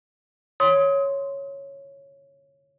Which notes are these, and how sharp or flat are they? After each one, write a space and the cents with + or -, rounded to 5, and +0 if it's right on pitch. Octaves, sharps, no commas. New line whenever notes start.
C#5 +0 C6 +0 D#6 +30